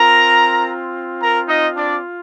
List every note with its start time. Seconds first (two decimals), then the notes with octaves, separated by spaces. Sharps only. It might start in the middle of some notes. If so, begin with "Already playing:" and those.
Already playing: C4 F4 A#4 A#5
1.20 A#4 A#5
1.48 D#4 D#5
1.77 D4 D5